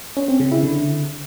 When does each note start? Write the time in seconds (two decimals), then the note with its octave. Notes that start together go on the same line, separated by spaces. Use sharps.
0.17 C#4
0.28 C4
0.40 C#3
0.52 E4
0.63 D3